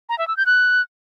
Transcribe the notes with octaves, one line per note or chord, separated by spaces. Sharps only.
A#5
E5
E6
G6
F#6